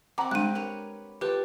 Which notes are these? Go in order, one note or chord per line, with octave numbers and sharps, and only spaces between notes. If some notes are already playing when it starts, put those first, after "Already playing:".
C4 F#5 A#5 B5 D6
G3 G#3 D4 G4 F#6 D#7
A#4 B4 C#5
F4 G4 A4 B4 G5 A5